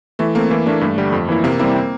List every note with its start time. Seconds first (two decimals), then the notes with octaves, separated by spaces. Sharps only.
0.19 E3 A3
0.35 A3 A#3 C4
0.50 E3 A#3
0.66 A3 A#3 D4
0.81 G2 A3
0.98 D3 G3
1.13 F2
1.29 E3 A#3 E4
1.44 C3 A#3
1.59 G3 A#3 C4 E4
1.75 C4